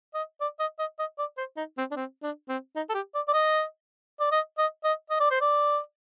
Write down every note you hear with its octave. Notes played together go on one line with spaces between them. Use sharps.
D#5
D5
D#5
D#5
D#5
D5
C5
D#4
C4
D4
C4
D4
C4
D#4
A4
G4
D5
D5
D#5
D5
D#5
D#5
D#5
D#5
D5
C5
D5